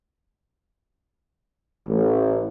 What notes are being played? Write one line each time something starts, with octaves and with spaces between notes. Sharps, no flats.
A1